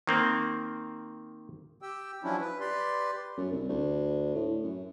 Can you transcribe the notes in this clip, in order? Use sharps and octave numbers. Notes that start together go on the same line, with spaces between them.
D#3 A#3 C4
G4 G5 E6
F3 F#3 C#4 D4 E4
B4
G4 B4 D5 C6
F#2
C2
D2
A2
F#2